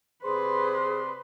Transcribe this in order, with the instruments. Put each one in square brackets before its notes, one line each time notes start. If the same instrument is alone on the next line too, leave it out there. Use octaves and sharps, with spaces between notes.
[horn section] C3 D5 C6 [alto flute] G#4 [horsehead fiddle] B4 [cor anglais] C5